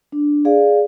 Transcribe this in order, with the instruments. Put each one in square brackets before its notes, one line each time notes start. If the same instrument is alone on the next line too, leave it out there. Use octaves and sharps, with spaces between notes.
[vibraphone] D4
G#4 D5 F5